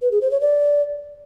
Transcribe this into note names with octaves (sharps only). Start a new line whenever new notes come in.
B4
G#4
C5
C#5
D5